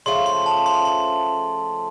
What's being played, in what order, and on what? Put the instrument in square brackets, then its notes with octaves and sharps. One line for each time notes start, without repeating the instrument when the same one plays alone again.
[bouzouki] C#3 F3 A3 [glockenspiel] C6
[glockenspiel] C6
A5
C6
C6